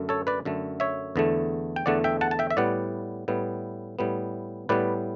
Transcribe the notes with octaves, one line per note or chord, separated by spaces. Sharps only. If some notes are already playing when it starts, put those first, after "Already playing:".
Already playing: F#2 D3 A3
A4 C#5
B4 D5
F#2 D3 A3
C#5 E5
E2 D3 A3
G5
E2 D3 A3 D5 F#5
E5 G5
F#5 A5
A5
E5 G5
E5
A2 G3 B3 D5 F#5
A2 G3 B3
A2 G3 B3
A2 G3 B3 B4 D5